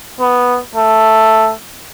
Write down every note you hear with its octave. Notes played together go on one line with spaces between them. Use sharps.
B3
A3